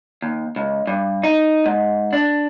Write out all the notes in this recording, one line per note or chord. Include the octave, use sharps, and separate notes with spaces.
D#2
C#2
G2
D#4
G#2
D4